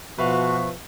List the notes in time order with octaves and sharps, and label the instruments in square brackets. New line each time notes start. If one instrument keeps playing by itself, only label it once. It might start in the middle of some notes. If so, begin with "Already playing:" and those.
[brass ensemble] B2 F3 [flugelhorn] F#4 [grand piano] B4 E5 F5 [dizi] C#6